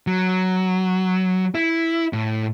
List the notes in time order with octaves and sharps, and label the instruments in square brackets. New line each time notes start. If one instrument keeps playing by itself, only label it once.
[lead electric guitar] F#3
E4
A2